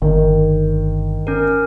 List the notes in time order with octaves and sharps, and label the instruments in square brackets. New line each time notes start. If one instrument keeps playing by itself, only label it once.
[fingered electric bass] G1 [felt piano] D#3
[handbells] C#4 A#4